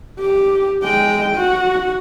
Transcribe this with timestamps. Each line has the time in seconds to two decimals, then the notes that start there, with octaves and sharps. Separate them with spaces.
0.19 G4
0.83 G#3 G5
1.36 F#4